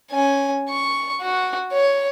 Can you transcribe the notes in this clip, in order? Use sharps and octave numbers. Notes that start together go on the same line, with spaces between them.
C#4 G#5
C#6
F#4
C#5